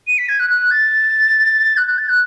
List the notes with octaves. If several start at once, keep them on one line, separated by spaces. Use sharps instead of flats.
D#7
B6
G#6
F#6
F#6
A6
F#6
F#6
A6
F#6